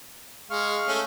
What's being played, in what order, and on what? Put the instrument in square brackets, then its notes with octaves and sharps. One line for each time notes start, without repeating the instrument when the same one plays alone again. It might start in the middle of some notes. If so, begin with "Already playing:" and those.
[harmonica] G#3 [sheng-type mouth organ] F5 C#6 F6
[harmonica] A3 C#4